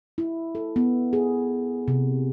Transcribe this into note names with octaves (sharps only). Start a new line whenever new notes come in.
E4
A4
B3
G#4
C3